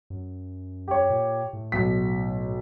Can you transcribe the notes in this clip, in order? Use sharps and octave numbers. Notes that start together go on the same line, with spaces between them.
F#2
G4 C#5
A#2
A2
B1 B6